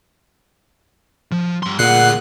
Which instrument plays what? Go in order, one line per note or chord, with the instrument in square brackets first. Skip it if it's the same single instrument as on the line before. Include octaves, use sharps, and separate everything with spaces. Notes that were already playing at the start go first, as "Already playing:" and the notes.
[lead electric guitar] F3
G2 C6
[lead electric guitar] D2 G#4 [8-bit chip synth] A#2 F#6 C7 [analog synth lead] F#5